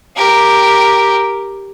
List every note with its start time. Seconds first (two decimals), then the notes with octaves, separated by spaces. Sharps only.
0.16 G4 A#4